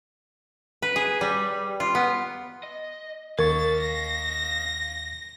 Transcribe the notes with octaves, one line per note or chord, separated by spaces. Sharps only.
B4
G#4
G3
F4
B3
D#5
D#2 A#4 D#5 F5 C#6 A6
A#6